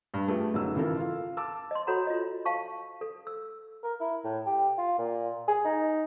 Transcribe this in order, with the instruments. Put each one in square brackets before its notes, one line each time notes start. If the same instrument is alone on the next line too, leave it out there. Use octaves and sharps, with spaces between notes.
[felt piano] G2
F3 A3 G4 G#4 B4
G1 F#2 B3 D#4 G#4 E6
G#1 C#3 E3 F3 A4 A#4
F4 F5
A5 D6 E6
[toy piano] D#5 C6
F#4 A4 C#5 F#5 A#5 B5
F4 D#5
F5 A5 C#6
A4
E6
[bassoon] A#4
E4
A2
G4
F4
A#2
G#4
D#4